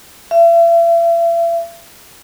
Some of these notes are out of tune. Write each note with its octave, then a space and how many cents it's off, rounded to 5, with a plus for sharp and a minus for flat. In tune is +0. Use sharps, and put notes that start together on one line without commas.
E5 +40